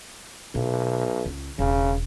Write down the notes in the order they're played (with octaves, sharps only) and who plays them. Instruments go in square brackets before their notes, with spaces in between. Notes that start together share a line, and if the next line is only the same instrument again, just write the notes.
[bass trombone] B1 [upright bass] B2
[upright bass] C#2
[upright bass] E1 [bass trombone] C#3